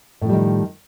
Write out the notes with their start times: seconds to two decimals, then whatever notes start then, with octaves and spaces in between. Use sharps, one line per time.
0.21 A2
0.25 F3
0.29 G3
0.33 D#3